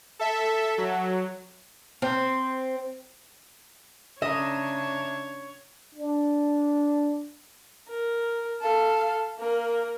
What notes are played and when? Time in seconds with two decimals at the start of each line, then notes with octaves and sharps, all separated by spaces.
0.19 A4 E5
0.78 F#3
2.02 C4
4.22 C#3 D4 C#5 D#5 E5 A#5
5.95 D4
7.88 A#4
8.61 A4 F5
9.39 A#3 A#4